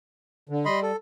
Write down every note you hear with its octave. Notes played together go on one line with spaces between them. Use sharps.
D3
G3 D#5 B5 C6
A4